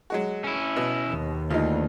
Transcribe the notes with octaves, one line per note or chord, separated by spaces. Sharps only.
F#3 G#3 F#4
C#4 E4
B2
D#2
D2 D#4 F4